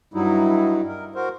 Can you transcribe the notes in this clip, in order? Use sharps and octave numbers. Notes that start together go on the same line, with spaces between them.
G2 F#3 G3 D#4 E4
A#4
F#4 A#4 C5